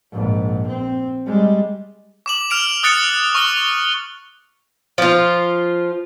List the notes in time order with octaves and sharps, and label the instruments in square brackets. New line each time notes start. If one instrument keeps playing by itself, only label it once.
[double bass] A#1 G#2
C4
G3 G#3
[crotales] D6 E7 F#7
F6 D7 F7
D#6 F#6 A6 C#7 D7
C#6 F6 G7
[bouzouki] F3 F4